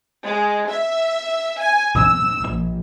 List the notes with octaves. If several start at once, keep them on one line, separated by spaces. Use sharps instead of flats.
G#3
E5
G#5
E6
A#1